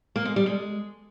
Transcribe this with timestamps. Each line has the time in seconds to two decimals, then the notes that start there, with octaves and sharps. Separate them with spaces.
0.16 A#3
0.25 G#3
0.36 G3
0.46 G#3